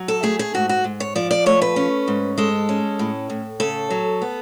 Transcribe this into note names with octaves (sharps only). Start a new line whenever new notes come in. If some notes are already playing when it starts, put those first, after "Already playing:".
Already playing: F#3
A4
A3 G#4
G#4
G#2 F#4
F#4
G#2
C#5
F3 D5
D5
A3 C#5
B4
C#4
G#2
G#3 A4
C#4
A2
A2
C#3 A4
F#3
B3